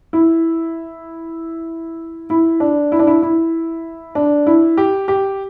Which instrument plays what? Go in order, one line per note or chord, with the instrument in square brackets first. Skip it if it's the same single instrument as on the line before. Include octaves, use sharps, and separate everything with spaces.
[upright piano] E4
E4
D4
E4
D4
E4
E4
D4
E4
G4
G4